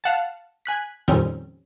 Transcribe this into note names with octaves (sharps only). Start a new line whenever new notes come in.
F5 F#5 A5
G#5 F#6 B6
F2 A#2 D#3 G3 C4 C#4